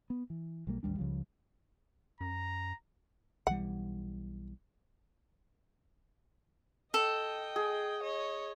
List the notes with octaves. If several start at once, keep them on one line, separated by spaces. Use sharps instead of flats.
B3
E3
B1 G3 A#3
A1 D#2 G3 D4
C#2 C#3 F3 G3
F#2 A#5
B1 E3 G3 F#5
A4 D#5 G5
G#4
C#5 D#5